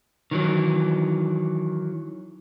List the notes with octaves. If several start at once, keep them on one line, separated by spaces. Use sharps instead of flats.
D#3 E3 F#3